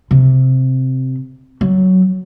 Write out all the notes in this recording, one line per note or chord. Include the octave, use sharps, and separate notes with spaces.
C3
F#3